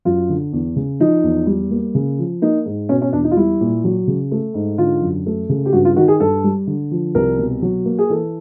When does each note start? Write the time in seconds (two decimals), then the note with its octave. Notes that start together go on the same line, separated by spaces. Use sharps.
0.05 F#2 F4
0.29 D3
0.53 E2
0.76 C#3
1.00 F3 D#4
1.23 E2
1.47 G3
1.71 A#3
1.95 C#3
2.19 F3
2.42 A#3 D#4
2.66 G#2
2.89 B2 C#4
3.02 C#4
3.13 E2 D4
3.24 D#4
3.31 F4
3.36 G3 E4
3.61 A#2
3.84 F#3
4.07 C#3
4.31 A3
4.54 G#2
4.78 D3 F4
5.02 F#2
5.26 A3
5.49 C#3
5.66 G4
5.73 G2 F#4
5.85 F4
5.96 D#3 F#4
6.08 G#4
6.20 G2 A4
6.44 G3
6.67 D3
6.91 F3
7.15 C2 A#4
7.39 B2
7.62 F#3
7.85 A#3
7.99 G#4
8.10 E3 A4